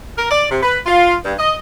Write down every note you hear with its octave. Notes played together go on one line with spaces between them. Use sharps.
A#4
D5
C3
B4
F4
G2
D#5